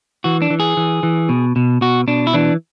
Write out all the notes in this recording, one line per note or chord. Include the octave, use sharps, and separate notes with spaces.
E3 F#4
D4
E3
G#4
E3
E3
B2
B2
B2 F#4
B2 D4
E4
E3 D4